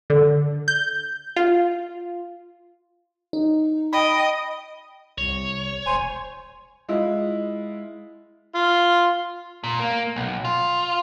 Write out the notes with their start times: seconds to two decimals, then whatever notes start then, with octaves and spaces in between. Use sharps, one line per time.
0.10 D3
0.68 G6
1.36 F4
3.33 D#4
3.93 D#5 G5 B5
5.18 C2 C#5
5.86 E1 C5 G#5
6.89 G#3 E4 F4
8.55 F4
9.64 A#2
9.80 A#3
10.16 B1
10.45 F4